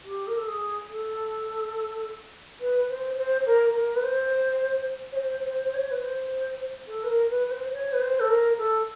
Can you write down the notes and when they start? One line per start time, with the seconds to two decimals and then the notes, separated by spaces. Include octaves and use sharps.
0.05 G4
0.27 A#4
0.37 A4
0.47 G#4
0.89 A4
2.60 B4
2.89 C5
3.17 C5
3.46 A#4
3.75 A#4
3.95 B4
4.03 C5
5.12 C#5
5.16 C5
5.45 C5
5.65 C5
5.74 C#5
5.90 B4
6.02 C5
6.87 A4
7.03 B4
7.08 A#4
7.30 B4
7.47 B4
7.51 C5
7.73 C#5
7.92 B4
8.01 C5
8.20 A4
8.29 A#4
8.58 A4